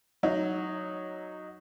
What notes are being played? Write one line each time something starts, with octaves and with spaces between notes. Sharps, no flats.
F#3 D#4